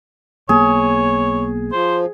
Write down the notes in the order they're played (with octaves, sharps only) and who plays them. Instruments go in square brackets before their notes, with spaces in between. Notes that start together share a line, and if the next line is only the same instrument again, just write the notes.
[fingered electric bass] B1 A#3 B3 [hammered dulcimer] G#4 [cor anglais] C#5
[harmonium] F3 [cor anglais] C5